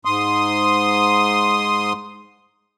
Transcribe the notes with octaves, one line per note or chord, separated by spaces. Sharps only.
G#2 C6 D#6